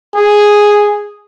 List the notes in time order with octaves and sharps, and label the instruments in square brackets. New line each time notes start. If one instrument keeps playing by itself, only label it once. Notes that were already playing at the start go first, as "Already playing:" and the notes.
[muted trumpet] G#4